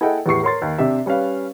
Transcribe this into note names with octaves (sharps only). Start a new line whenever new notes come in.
E4 G#4 A4 D#5 F#5 G5
E2 A2 G4 C#6 C7
A#4 C#5 C6 A6
D#2
C3 D4 G4 E5
G3 C#4 B4 F5